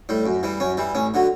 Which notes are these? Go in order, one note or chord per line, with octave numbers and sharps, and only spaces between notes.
A2 G3
F#2
E3 G3
F#2 C#4
E3 G3
A1 C#4
D3 F#3